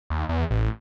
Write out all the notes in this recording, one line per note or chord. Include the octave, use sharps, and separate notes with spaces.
D#2
E2
A1